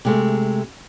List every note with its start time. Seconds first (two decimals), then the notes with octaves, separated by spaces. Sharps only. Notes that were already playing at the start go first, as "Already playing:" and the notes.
0.05 C3 G#3 A3